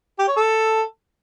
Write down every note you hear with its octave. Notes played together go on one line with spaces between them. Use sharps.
G4
C#5
A4